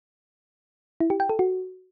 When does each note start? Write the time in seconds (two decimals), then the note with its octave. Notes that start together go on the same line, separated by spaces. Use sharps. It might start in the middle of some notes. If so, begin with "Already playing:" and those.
1.00 E4
1.10 G4
1.20 G5
1.29 A4
1.39 F#4